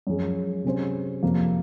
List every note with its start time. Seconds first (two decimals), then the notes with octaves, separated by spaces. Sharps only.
0.07 F#2 F3 G#3
0.64 C3 F#3 C#4 G#4 C5
1.23 F2 C3 F3 A#3